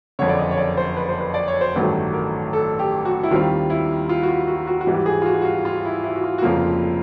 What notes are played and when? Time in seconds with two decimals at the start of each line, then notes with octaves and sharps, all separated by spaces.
0.19 F#1 F2 D3 C#5
0.29 D5
0.38 D#5
0.51 C#5
0.58 D5
0.77 C5
0.97 B4
1.09 C5
1.20 B4
1.34 D5
1.48 C#5
1.61 C5
1.75 A1 G2 D#3 F#3 A3 B4
2.13 A#4
2.53 A4
2.79 G4
3.01 G4
3.05 F#4
3.23 E4
3.31 D#2 D#3 G3 C4 F4
3.70 E4
4.09 F4
4.23 F#4
4.28 F4
4.47 F#4
4.67 F#4
4.81 F#4
4.87 G#2 E3 G3
4.94 G4
5.06 G#4
5.22 F4
5.26 F#4
5.41 F#4
5.45 F4
5.65 F4
5.85 E4
6.04 E4
6.15 F#4
6.24 F4
6.38 F#4
6.42 F1 F2 C#3 F3 A#3 F4